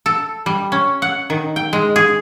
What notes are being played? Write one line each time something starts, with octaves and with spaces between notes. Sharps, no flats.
A4
G3
C#4
F#5
D#3
G5
G#3
G#4